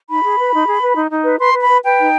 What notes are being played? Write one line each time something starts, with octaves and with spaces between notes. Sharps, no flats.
D#4 B5
G#4
B4
D#4
G#4
B4
D#4
D#4
B4
B4 C6
B4
B5
B4
B4 G5
D#4